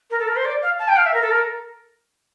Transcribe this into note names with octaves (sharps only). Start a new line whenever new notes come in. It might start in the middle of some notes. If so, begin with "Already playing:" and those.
A#4
A4
A#4
C5
D5
F5
A5
G5
F5
E5
A#4
A4
A#4